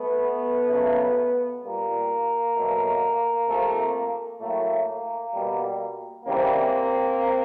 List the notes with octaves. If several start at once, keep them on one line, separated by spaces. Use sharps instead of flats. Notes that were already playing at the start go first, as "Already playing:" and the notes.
Already playing: A3 B3
C#3 F#3 A3
A#2 G3 A#3
B2 F#3 A3
C3 F3 A3
A2 F#3 A3 A#3
B2 G3
C#3 E3 G3 A#3 C4